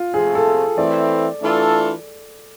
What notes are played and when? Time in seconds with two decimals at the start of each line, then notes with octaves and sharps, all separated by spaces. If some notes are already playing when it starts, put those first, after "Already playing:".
Already playing: F4
0.13 C3 F3 A3 G#4
0.35 A4
0.77 E3 A3 C4 D5
1.41 E3 A3 D4 F4 A4